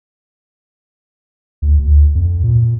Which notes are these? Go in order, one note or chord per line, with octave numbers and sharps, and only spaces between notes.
D2
D2
F2
A#2